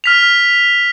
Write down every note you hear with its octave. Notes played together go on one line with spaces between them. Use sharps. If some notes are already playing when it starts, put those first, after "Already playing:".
F6 B6 F7